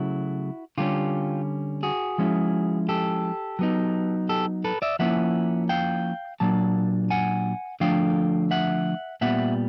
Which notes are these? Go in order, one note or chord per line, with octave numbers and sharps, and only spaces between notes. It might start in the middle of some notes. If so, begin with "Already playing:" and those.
Already playing: C#3 F#3 A3 E4 F#4
D3 G3 A#3 C#4 F4 G4
F#4 G#4
F3 G#3 C#4 E4
G4 A4
F#3 B3 D#4
G4 A4
A4 B4
D5 E5
F3 A#3 C#4 E4 E5 F#5
F5 G5
A#2 F#3 A#3 D4 A5
F#5 G#5
D3 F3 A3 D4 F5 G5
E5 F#5
A#2 G3 B3 E5 F#5